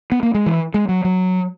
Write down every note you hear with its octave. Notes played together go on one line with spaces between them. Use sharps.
B3
A#3
G#3
E3
G#3
F#3
F#3